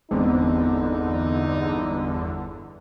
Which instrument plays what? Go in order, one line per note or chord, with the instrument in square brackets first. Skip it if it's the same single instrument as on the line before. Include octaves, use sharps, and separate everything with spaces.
[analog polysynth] G1 E2 D3 [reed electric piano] G#3 B3 C4 [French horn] D#4